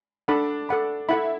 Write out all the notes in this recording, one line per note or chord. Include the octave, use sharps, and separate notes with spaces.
D4 A4 F#5 B5
A4 F#5 B5
E4 A4 F#5 B5